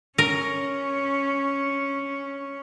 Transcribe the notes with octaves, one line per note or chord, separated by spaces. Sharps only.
C#4 A#4